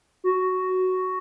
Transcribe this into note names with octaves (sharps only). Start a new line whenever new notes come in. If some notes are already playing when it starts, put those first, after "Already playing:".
F#4